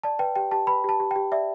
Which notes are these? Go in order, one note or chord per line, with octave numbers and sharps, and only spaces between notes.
D5 A5
B4 G5
G4 G5
G4 A5
B4 B5
G4 A5
G4
G4 G5
D5 E5